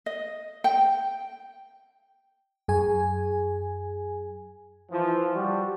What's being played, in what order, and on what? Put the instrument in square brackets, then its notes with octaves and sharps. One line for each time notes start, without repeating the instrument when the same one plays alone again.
[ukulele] D#5
G5
[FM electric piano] F#2 G#4 G#5
[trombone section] E3 F3
G3 F#4